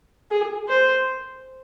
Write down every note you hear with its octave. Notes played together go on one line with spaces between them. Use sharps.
G#4
C5